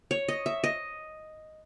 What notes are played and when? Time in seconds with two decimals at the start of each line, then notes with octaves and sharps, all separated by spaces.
0.11 C#5
0.28 D#5
0.46 E5
0.64 D#5